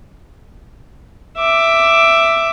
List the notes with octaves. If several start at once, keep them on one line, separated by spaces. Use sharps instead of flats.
E5 D6